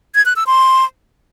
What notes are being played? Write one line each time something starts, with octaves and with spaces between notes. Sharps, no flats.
G#6
F#6
E6
C6